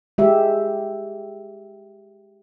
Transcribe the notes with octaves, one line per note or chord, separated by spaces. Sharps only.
G#3 G4 E5